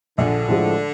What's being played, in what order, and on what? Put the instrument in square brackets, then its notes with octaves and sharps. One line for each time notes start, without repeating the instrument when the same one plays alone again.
[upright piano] A#1 [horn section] D3
[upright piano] A2 F3 G#3